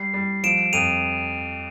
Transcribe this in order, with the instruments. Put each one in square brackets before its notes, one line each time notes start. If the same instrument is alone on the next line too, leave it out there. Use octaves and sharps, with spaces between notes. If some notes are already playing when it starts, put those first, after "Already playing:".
Already playing: [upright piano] G3 [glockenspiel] C7
[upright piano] G3
[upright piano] F3 [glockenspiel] D7 E7
[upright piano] F2 [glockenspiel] D#7 F7